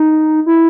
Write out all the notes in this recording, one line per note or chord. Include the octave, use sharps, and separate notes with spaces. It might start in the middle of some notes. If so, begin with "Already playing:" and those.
Already playing: D#4
E4